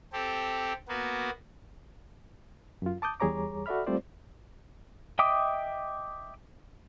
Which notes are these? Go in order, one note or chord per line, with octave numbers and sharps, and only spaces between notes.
C4 G4 A4
A#3 B3 F#4
F#2 F4
A5 D6 D#6 G6
E2 G3 G#4 C#5 A#5 D6
F#4 A4 D5 E5 B5 F6
G3 A3 C4 F4 C5 D5
D#5 E5 G5 D6 D#6